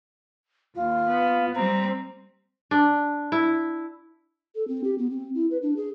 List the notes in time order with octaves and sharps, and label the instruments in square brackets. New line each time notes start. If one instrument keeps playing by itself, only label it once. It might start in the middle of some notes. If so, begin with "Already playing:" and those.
[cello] D#2 [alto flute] F4
[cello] B3
[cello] G3 C4 [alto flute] A#5
[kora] D4
E4
[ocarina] A4
C4
G4
B3
C4
E4
B4
D4
G#4